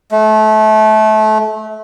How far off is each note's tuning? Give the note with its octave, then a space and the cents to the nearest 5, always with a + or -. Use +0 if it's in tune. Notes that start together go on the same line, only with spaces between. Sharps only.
A3 -25